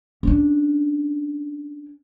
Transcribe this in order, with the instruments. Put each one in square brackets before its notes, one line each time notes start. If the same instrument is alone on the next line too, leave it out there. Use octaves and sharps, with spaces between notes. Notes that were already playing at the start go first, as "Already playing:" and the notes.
[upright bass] C#4 D4